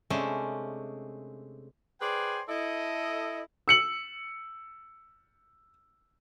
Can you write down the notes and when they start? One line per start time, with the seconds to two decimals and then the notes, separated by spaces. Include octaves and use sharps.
0.10 C3 G#3 A3 C#4 D4
2.01 G#4 B4 C5 D5 G5 G#5
2.48 E4 A4 D#5
3.68 E6 C#7 F#7